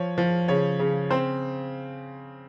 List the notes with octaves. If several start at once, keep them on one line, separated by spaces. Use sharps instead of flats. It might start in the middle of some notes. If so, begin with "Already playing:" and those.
Already playing: F3 C#5
F3
C#3 C#5
C#3
C4 C5